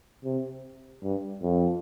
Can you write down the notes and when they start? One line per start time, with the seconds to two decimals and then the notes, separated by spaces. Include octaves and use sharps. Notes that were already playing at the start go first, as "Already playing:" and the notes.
0.25 C3
1.03 G2
1.42 F2